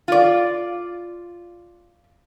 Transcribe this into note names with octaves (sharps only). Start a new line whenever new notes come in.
F4 D5